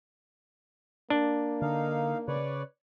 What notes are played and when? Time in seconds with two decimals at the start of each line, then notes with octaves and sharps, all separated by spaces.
1.10 A#3 D4
1.62 D3 D#4 F5
2.28 C#3 B4 C#5 D5